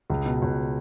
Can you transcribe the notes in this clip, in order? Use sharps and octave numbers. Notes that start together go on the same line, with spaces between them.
C#2
B2
C#2